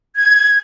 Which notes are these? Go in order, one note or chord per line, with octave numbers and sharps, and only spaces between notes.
G#6